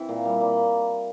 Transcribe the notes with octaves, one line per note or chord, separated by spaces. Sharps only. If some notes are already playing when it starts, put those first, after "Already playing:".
Already playing: E3 C4 E4
A#2
G3
G3 A#3